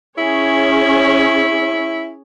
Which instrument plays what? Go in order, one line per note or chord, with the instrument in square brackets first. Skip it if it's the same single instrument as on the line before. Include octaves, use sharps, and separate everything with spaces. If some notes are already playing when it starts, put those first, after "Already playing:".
[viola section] C#4 G#4 C#5 [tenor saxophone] E4